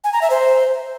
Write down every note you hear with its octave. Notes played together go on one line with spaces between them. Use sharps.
G#5
A#5
E5
C5